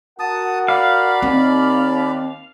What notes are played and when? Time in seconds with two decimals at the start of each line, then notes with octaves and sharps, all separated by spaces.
0.19 F#4 A#4 F#5 A5 D#6
0.68 D5 F5 B5
1.22 D#2 C4